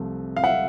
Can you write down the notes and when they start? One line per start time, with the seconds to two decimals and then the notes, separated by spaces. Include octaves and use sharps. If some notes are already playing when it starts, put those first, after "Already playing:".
Already playing: C2 C3 F3 A3
0.37 F5
0.44 E5 F#5